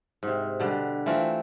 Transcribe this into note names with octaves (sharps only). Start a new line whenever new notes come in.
G#2 C3
B2 D3 G3
E3 A3 C4 F4